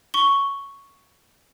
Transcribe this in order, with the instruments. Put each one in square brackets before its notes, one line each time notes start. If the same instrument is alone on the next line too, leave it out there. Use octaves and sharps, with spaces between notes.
[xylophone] C#6 G7